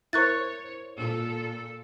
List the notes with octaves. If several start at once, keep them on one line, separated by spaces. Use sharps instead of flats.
E4 A#4 C5 C#5 C#6 F#6 A6
A#2 A4